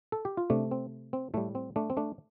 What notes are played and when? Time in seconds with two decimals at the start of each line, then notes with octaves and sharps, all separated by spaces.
0.12 A4
0.25 G4
0.37 F4
0.50 C3 A3 D4
0.71 C4
1.13 C4
1.34 A2 G3 A3
1.55 C4
1.76 A3 D4
1.90 C4
1.97 A3 D4